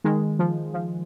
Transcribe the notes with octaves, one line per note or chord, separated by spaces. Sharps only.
D#3 G#3
F3
F3